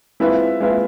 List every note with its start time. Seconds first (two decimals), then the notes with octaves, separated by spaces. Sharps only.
0.20 G#3 C4 E4 F4 B4 E5
0.61 G#3 C4 F4 B4 E5